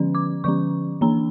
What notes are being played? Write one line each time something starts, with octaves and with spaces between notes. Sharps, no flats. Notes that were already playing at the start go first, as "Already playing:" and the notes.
Already playing: D3 F3 C#4
D6
D3 F3 C#4 C#6
E3 A#3 D4 A#5